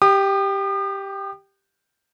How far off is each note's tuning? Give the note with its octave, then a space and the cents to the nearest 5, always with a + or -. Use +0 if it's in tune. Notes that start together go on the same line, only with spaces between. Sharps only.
G4 +0 D#6 -45